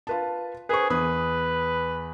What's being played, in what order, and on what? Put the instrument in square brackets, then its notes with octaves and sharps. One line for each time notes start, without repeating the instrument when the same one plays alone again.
[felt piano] F4 B4 A5
[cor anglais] G#4 [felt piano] B4 C5 C#6
[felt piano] E2 D#6 [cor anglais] B4